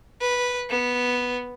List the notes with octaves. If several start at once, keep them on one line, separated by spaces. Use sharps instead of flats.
B4
B3